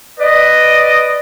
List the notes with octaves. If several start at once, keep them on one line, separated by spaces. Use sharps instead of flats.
B4 D5 D#5